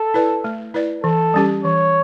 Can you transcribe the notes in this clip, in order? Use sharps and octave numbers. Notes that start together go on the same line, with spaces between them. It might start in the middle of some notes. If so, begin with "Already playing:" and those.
Already playing: A4
E4 B4 D5
A3
E4 B4 D5
E3 A4
G3 C#4 G4
E3 C#5